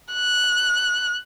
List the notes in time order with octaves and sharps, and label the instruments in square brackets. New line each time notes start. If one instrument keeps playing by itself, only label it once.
[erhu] F#6